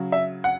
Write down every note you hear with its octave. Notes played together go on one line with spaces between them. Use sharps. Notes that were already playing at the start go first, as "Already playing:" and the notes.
Already playing: C#3 F#3
E5
F#5